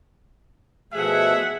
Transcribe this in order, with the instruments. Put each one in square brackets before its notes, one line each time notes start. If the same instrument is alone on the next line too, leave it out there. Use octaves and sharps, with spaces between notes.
[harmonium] B2 F3 A3 [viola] G#4 F#5 [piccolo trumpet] E5